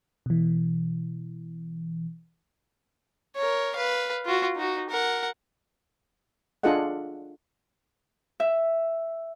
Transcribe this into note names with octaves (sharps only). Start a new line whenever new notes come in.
B2 E3
A#4 C#5
B4 F5
F4 F#4
D#4 F#4
A#4 F#5
D4 F4 G#4 A4 D#5 F#5
E5